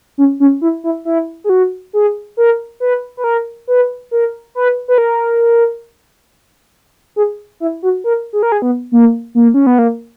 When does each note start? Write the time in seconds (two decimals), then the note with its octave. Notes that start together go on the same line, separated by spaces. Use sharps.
0.18 C#4
0.40 C#4
0.61 E4
0.84 E4
1.05 E4
1.44 G#4
1.49 F#4
1.93 G#4
2.37 A#4
2.80 B4
3.17 B4
3.24 A#4
3.68 B4
4.11 A#4
4.55 B4
4.88 B4
4.98 A#4
7.16 G#4
7.60 E4
7.83 F#4
8.04 A#4
8.33 G#4
8.43 A#4
8.52 G#4
8.62 B3
8.92 A#3
9.35 A#3
9.54 C#4
9.67 B3
9.79 A#3